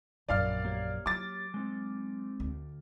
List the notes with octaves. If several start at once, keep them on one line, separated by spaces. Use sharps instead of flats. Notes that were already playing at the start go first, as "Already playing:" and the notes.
A#1 F#2 D5 F5 F6
A#3 G4 C#5
F#3 D6 A6
G#3 C4 D#4
D2